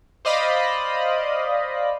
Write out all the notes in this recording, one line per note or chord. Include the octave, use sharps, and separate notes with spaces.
C5 D5 D#5 F5 B5